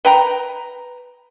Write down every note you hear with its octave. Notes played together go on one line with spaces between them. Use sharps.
B4 G5 A#5